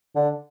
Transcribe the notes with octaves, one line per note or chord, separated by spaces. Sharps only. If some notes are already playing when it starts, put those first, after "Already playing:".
D3